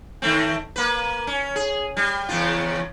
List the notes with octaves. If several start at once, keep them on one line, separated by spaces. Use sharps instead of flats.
D#3 A3 C4
A#3 B4
C#4
G#4
G3
E2 C#3 F4